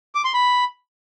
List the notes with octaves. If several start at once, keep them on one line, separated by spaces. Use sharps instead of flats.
D6
C6
B5